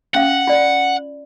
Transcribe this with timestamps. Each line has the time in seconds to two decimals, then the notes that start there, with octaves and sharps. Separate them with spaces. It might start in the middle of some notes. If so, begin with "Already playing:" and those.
0.15 C#4 F5 F#5
0.47 F4 D5